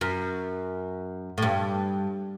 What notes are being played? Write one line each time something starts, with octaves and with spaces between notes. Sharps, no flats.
F#2
A2
G2